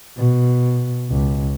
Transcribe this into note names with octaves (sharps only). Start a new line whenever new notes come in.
B2
C#2